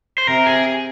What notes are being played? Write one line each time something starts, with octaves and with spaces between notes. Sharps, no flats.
C5
C3 A#4
G#4